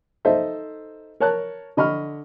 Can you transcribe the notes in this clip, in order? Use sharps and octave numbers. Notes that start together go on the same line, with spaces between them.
D#4 A4 C5 D#5 E5
A#4 C#5 A5 F#6
D3 D#5 B5 C#6 F6